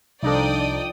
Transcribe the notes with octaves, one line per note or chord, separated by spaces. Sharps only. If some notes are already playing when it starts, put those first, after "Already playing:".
C2 F3 D4 D#4 A4 D5 G5 D#6